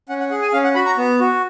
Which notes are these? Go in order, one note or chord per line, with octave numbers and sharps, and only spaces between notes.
C#4 F#5
F#5
G#4 F#5
G#5
C#4 F5
F#5
F#4 B5
A#5
B3
F#4